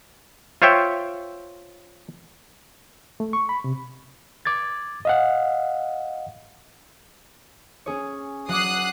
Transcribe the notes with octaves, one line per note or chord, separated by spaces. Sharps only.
F4 C5 C#5 E5 G5
A3
C#6
B5
C3
D6 G#6 A6
D#5 F5 F#5
C#4 G#4 C#5
F#3 F#5 D6 D#6 F#6 C7